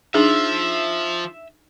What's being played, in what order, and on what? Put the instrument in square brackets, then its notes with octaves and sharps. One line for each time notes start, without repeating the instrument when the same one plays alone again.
[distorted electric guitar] F3 [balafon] D4 D#4 G#4 [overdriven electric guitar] E5